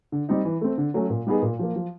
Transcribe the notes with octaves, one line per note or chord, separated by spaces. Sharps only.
D3
G3 C4 D#4
E3
A3 C4
D3
F#3 A3 C#4
A#2
G3 B3 D#4 G#4
A#2
F3 A#3
F3